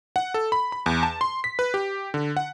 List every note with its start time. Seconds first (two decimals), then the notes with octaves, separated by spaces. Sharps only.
0.16 F#5
0.34 A4
0.52 B5
0.72 B5
0.86 E2
1.03 A5
1.21 C6
1.44 B6
1.59 B4
1.74 G4
2.14 D3
2.37 F#5